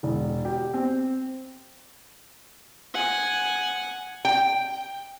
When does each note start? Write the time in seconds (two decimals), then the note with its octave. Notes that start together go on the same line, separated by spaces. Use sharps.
0.03 E1
0.45 G4
0.74 C4
2.94 F#5 G#5
4.25 G5